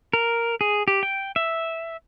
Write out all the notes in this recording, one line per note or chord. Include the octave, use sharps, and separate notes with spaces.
A#4
G#4
G4
G5
E5